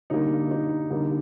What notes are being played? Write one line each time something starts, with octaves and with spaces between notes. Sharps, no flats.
D3 G3 A#3 D#4
D#4
D3 G3 A#3 D#4